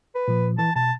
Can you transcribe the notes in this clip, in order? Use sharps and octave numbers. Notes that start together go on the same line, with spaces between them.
B4
A#2 F3
E3 A5
B2 A5